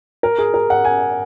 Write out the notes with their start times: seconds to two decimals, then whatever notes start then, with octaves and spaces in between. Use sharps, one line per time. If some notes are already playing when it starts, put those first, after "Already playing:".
0.23 A#4
0.38 G#4
0.54 A#4
0.70 F#5
0.85 G#5